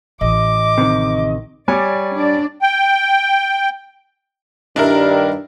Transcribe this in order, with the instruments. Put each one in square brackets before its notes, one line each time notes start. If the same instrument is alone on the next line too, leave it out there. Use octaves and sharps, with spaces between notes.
[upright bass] A1 [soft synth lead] D#5 [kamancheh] D6
[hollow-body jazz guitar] C3 D#3
[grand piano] G3 G#5 [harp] C#5 D6 [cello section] D5
[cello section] D4 D5
[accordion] G5
[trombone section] G2 D#3 G3 [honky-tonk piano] D4 E4 A#4